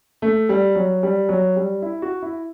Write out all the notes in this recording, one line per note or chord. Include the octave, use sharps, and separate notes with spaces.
A3
G3
F#3
G3
F#3
G3
E4
F#4
E4